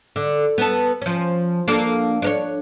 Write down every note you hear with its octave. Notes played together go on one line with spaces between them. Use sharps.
D3
B3 A4
F3 C#4
A#3 D4 A4
D4 A#4 C#5